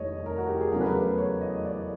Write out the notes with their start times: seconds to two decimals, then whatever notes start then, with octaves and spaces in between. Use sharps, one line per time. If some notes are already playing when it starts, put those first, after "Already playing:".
Already playing: F1 D#2 G3 C#5 D#5
0.26 A#4
0.38 F#4
0.49 G4
0.60 G#4
0.72 E2 C#3 F#3 A3 A#4
0.81 B4
0.91 A#4
1.18 C#5
1.41 D#5
1.65 D5